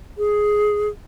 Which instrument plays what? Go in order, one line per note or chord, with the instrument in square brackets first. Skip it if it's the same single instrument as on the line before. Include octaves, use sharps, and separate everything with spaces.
[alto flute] G#4